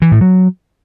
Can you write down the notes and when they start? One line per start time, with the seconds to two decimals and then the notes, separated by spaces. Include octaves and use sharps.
0.02 E3
0.11 A2
0.21 F#3